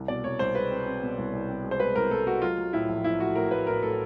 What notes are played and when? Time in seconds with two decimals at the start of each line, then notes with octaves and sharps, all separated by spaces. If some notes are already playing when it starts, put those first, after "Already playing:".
Already playing: C2
0.08 B2 D5
0.24 C2 C#5
0.39 C2 C5
0.55 G#3 B4
0.71 C4
0.86 C4
1.02 B2
1.18 C2
1.33 C2
1.49 C4
1.64 G#3
1.71 C5
1.80 G#3 B4
1.95 C2 A#4
2.11 C2 A4
2.27 G#3 F#4
2.42 F#3 F4
2.58 F#3
2.73 A2 E4
2.89 A#1
3.04 A#1 E4
3.20 A3 F#4
3.35 A2 A#4
3.51 A2 B4
3.67 A2 A#4
3.82 A2 A4